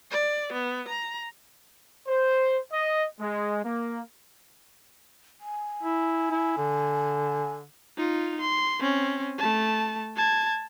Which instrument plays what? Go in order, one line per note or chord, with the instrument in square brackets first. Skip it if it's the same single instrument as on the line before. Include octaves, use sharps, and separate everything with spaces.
[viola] D5
B3
A#5
[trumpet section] C5
D#5
G#3
A#3
[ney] G#5
[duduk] E4
E4
D3
[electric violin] D#4 F4
C6
C4 C#4
A3 A5
A5 G#6